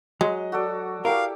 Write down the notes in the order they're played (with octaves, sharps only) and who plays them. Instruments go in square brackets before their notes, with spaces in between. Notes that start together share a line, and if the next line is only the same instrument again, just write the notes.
[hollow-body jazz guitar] F#3 [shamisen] G#3 [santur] D#5
[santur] F#4 A4 D5
[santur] E4 G4 D5 [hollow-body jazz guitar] A#4 [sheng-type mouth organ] F5